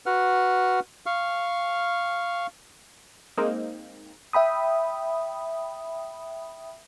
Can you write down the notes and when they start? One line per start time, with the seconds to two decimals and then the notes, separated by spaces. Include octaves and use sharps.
0.06 F#4 B4 F#5 F6
1.06 F5 C#6 F6
3.37 G#3 A#3 C4 D#4
4.33 E5 G5 B5 D#6